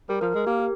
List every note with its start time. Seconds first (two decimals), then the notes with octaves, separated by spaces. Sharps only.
0.09 G3 A#4
0.21 F3 A#4
0.34 G#3 A#4
0.47 A#3 G4
0.60 G4